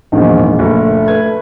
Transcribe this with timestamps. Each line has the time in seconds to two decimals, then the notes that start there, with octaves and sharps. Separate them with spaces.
0.12 A#1 E2 G#2 B2 D#3
0.59 F#1 A3
1.08 B4 G#6